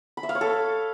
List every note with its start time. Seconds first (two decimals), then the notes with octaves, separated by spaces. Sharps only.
0.17 B5
0.23 E5
0.29 F5
0.35 C#5
0.41 A4